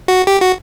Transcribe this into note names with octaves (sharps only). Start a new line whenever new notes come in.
F#4
G4
F#4